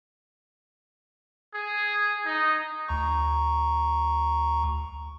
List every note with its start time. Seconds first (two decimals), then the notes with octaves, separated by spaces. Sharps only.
1.54 G#4
2.26 D#4
2.88 D2 A#5 C#6